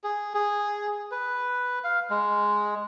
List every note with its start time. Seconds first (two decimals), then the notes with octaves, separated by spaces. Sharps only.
0.04 G#4
0.34 G#4
1.11 B4
1.84 F5
2.10 G#3